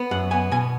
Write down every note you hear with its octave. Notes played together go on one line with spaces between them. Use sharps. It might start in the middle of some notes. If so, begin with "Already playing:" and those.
Already playing: B3
F#2 F#5
B3 G#5
B2 G#5